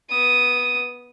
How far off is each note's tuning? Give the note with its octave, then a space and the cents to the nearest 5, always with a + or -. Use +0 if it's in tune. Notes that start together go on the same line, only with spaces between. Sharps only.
B3 -10 D#6 +0